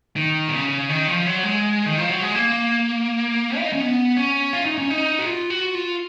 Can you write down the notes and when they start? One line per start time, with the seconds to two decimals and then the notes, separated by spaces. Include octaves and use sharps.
0.16 D#3
0.48 B2
0.53 C#3
0.89 D#3
1.07 F3
1.26 F#3
1.43 G#3
1.86 D#3
1.98 F3
2.10 F#3
2.22 G#3
2.35 A#3
3.58 F4
3.65 D#4
3.73 C#4
3.80 B3
4.17 C#4
4.53 F4
4.65 D#4
4.78 C#4
4.90 D#4
5.19 F#4
5.26 F4
5.50 F#4
5.75 F4